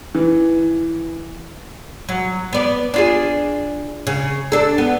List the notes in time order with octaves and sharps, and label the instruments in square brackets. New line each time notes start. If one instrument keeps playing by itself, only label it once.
[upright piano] E3
[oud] F#3
B3 D5
D4 F4 G#4
C#3
D4 A4
B3